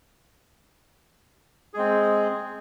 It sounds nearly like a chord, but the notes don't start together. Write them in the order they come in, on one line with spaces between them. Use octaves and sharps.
G#4 G#3 C4